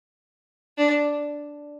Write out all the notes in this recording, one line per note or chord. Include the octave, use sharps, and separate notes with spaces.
D4